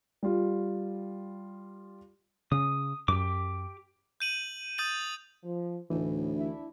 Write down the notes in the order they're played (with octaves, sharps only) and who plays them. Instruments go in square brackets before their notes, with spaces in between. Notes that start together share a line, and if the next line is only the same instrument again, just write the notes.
[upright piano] G3 F4
[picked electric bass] C#3 C#4 [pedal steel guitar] D#6
[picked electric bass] F#2 [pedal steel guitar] G4 D6
[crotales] G6 D#7 F#7
D#6 G6 A6 D#7 F#7
[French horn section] F3
[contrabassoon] D2 [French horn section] A2 [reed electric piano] E3 D#4
[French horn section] D4 E4